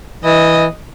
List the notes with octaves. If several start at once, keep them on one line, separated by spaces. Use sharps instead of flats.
E3 D#5